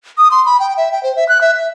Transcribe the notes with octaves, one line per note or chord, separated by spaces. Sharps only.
D#6
C6
B5
G5
E5
G5
C5
E5
F#6
E5
E5